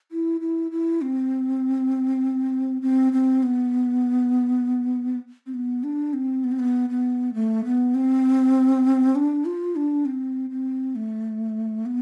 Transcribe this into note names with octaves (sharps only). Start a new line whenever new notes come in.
E4
E4
E4
C4
C4
C4
B3
C4
B3
D4
C4
B3
C4
B3
B3
A3
B3
C4
D4
F4
D4
C4
C4
A3
B3